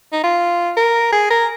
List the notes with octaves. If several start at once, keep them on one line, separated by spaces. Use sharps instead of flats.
D#4
F4
A#4
G#4
A#4